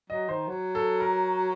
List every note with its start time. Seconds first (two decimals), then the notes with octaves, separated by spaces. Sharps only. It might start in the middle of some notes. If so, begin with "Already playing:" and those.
0.10 F#3 D#5
0.29 D#3 C5
0.48 F#3
0.75 A4
1.00 A#4